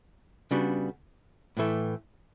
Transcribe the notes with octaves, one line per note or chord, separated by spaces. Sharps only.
C#3 G3 B3 D4 F#4
A2 E3 A3